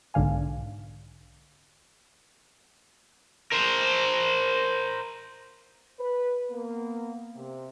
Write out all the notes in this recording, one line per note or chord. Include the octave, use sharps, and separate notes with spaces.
B1 G#2 D3 F5 G#5
A#4 C5
B4
A#3 B3
C3